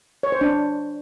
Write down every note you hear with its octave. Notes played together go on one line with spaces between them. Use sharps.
C#5
C5
D4